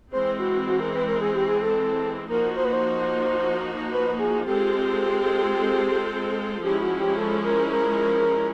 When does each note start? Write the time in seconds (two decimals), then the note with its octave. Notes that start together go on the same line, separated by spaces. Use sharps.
0.12 E3 G#3 C4 C5
0.39 F#4
0.67 F#4
0.80 A#4
0.94 B4
1.08 A#4
1.21 G#4
1.35 G4
1.48 G#4
1.62 A4
2.29 F3 A#3 D#4 F#4 A#4
2.56 C5
2.65 B4
2.73 C5
3.92 B4
4.19 G#4
4.46 G#3 C4 F4 G4 A4 C5
6.63 F3 G#3 C#4 E4 G4
6.81 F#4
7.00 G4
7.17 A4
7.44 A#4
7.71 A#4